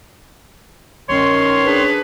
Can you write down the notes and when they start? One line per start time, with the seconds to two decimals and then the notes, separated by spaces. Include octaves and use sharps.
1.09 G1 D#3 C#4 C#5 C6
1.65 D4 G#4 B4